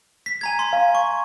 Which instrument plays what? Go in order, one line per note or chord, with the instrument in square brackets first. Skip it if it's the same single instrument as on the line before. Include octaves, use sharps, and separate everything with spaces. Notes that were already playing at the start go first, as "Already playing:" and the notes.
[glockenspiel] B6
G#5 A#5 G#6
C6
[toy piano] F5
[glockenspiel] C#6